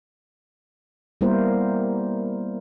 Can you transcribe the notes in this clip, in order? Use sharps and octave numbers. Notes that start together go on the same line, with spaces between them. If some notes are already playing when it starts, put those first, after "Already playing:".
G3 A#3 B3 E4 A#4 C5